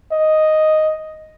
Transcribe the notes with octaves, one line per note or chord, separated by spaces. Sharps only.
D#5